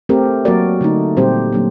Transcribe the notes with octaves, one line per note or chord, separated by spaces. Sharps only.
A3 C4 G4 A#4
F#3 A#3 F#4 A#4 D5
D3 A3 D#4
A#2 G3 C4 G4 C5
F#3 A#3 D4